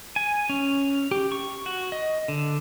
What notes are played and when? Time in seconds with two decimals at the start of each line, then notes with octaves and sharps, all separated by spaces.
0.16 G#5
0.49 C#4
1.11 G4
1.32 C#6
1.66 F#4
1.92 D#5
2.28 D3